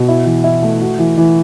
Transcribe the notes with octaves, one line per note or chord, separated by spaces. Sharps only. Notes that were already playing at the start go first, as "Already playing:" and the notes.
Already playing: B2
E4
E3
E4
A3
F#4
E3
E3